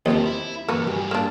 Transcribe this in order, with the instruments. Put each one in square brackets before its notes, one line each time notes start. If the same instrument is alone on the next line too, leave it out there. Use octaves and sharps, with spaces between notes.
[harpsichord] D#2 [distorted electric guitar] C3 [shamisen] F3 C#5 D#5
[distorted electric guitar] E4
[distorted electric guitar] E2 G2 [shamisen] A#3 F#4 B4
[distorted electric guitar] G2 G#4 [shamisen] G4
[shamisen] A#3 D4